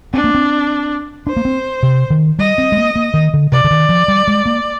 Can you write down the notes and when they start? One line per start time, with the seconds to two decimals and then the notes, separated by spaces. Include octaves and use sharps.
0.14 C4 D4
0.24 A#3
0.34 C4
1.27 D4 C5
1.37 A#3
1.45 C4
1.83 C3
2.10 D#3
2.39 G3 D#5
2.58 C4
2.72 G#3
2.77 A#3
2.96 A#3
3.14 D#3
3.34 D3
3.52 C3 D5
3.64 D3
3.71 D#3
3.89 F3
4.08 G3
4.28 G#3
4.46 A#3